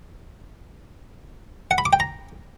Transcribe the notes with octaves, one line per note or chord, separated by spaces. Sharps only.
F#5
B5
D6
G5
A#5